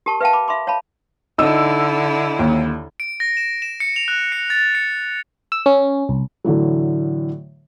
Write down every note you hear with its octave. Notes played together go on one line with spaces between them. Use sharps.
G4 A#4 A5 C#6
B4 E5 F5 G5 A5
B5 D6
E5 B5 C6 D6
C#5 F5 A5 B5
D3 D#4 E4 E6
D#2
D7
A#6
E7
E7
C#7
F7
F#6
C#7
A6
C#7
E6
C#4
C2
A2 D3 E3 F#3